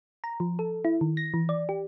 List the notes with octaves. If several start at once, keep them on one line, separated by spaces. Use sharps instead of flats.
A#5
F3
A4
E4
D#3
A#6
E3
D5
G4